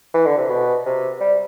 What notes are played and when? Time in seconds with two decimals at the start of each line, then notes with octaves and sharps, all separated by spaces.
0.14 E3
0.26 D3
0.38 C3
0.49 B2
0.86 C3
1.20 G3